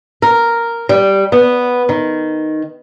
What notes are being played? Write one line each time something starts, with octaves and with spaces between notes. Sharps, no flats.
A#4
G3
B3
D#3